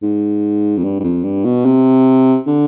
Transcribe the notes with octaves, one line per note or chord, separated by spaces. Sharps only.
G#2
F2
G2
G2
F2
G2
B2
C3
D3